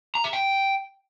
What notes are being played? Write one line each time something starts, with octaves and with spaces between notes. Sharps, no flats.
A#5
E5
G5